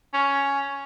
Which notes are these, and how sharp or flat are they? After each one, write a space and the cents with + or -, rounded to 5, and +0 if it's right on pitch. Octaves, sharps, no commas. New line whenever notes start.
C#4 +5